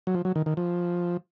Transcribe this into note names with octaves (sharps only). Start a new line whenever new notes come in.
F#3
F3
F#3
D#3
D#3
F3